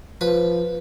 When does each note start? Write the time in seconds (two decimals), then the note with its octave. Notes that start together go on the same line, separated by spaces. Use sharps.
0.21 F3 B4 B5